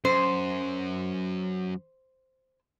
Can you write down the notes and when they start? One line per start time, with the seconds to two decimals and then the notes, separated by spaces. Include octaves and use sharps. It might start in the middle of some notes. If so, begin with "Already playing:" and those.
0.05 F#2 C5